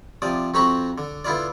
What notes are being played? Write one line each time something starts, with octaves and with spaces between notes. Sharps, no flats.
C3 F3 D5 D#6
F2 C4 F#4 A#5 B5 C#6
D3
D3 B3 E4 F4 D5